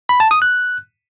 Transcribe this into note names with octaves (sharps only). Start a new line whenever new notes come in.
B5
A5
D#6
F#6